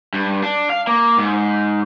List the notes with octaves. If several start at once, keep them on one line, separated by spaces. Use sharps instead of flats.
G2
D4
F5
A#3
G#2